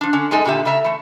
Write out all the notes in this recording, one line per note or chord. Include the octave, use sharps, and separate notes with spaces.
F3 D4
D3 C#4
F#2 G#3 D#4 A4 G#5
E2 A#2 D3 G4 E5
C#3 A3 E5 A#5
E3 A3